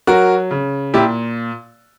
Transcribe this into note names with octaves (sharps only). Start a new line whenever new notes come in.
F#3 F#4 A#4
C#3
A#2 E4 G4